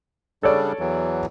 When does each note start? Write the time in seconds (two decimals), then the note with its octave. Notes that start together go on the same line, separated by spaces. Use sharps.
0.43 C#3 G3 D4 A4 C#5 D5
0.79 E2 E3 F#3